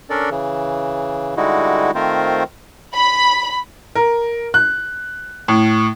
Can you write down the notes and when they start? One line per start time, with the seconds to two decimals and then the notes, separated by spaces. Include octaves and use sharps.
0.10 C#4 D4 A4 A#4 D5
0.30 C#3 E3
1.37 D3 G3 G#3 D#4 E4 F#4
1.95 D#3 A3 C4 F4 A#4 C5
2.94 B5
3.95 A#4
4.54 F#6
5.48 A2